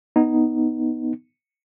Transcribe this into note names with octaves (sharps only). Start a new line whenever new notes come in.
B3 D#4